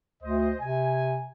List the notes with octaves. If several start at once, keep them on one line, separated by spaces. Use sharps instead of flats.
D2 C5 D#5
C3 G#5